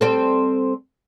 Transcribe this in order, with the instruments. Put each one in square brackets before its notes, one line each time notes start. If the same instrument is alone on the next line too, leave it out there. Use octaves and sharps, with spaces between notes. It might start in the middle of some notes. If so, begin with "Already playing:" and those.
[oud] G3 C4 A4